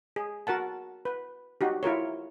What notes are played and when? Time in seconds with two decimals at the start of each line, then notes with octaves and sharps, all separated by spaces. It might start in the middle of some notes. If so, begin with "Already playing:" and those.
0.16 G#4
0.47 F#4 A#4 F#5 A5
1.05 B4
1.61 D#4 F#4 G4
1.83 E4 F4 A#4 C#5